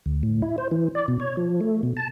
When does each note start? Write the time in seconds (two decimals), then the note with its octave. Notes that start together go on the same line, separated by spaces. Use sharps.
0.06 D2
0.23 A2
0.42 E4
0.58 C5
0.71 E3
0.95 D5
1.08 B2
1.20 C#5
1.37 F3
1.60 A3
1.83 B2
1.97 A5